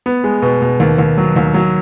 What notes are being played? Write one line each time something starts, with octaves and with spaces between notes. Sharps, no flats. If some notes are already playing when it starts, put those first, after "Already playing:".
B3
G#3
B2
B2
D#2
D#2
F#3
D#2
F#3